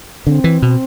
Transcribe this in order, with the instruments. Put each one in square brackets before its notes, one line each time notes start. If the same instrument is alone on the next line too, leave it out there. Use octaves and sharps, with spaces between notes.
[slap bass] D3 [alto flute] C4
[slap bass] E3
B2